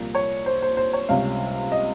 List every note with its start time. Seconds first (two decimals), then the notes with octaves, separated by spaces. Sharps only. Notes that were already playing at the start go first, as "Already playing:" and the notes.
Already playing: C2 A#2 F3 A#3
0.15 C#5
0.46 C5
0.62 C5
0.77 C5
0.93 C#5
1.09 C#2 C3 G3 C#4 F5
1.72 D#5